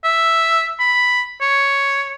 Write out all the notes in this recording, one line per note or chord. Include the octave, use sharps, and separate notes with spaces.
E5
B5
C#5